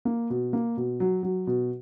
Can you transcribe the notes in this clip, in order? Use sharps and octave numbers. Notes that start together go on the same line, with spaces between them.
A#3
B2
A#3
B2
F#3
F#3
B2